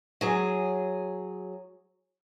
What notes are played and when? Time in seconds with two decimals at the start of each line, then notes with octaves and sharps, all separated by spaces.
0.21 F#3 G#4